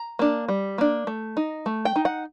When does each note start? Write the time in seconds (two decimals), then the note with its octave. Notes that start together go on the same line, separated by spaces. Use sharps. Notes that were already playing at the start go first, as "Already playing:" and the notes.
Already playing: A#5
0.19 A#3 D4
0.48 G3
0.78 A#3 D4
1.07 A3
1.37 D#4
1.66 A3
1.85 G5
1.96 D#4
2.05 F#5